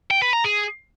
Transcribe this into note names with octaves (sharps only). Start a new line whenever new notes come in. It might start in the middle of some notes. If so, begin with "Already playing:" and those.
G5
B4
A#5
G#4